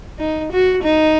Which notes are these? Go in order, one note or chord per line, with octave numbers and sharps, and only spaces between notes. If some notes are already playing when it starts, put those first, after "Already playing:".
D#4
F#4
D#4